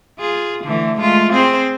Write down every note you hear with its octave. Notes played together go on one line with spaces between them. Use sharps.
F4 G#4
D3 E3 A3
G#3 A3 F4
C4 G#4 C5